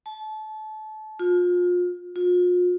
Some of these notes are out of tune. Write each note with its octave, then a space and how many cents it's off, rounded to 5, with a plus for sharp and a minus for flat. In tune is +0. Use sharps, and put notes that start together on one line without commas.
A5 -30
F4 +30
F4 +40